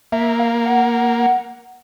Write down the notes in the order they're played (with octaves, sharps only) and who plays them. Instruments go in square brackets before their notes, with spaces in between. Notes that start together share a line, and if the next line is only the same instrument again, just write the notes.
[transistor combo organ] A#3 [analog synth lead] E5
[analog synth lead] F5
F#5